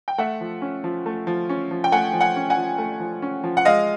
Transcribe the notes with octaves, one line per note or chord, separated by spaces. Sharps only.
G5
A3 E5 F#5
F3
C#4
F3
A3
F3
C#4
F3
G5
A3 F#5 G#5
F3
F#5 G#5
C#4
F#5 G#5
F3
A3
F3
C#4
F3
F#5
G#3 D#5 F5